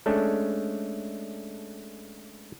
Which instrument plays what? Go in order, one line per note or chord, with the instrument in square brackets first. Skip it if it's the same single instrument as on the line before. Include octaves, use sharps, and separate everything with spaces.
[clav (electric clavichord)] G#3 A3 C#4 D4 A4